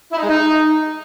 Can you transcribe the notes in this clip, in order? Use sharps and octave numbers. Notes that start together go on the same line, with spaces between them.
E4
D#4
G#3
D#4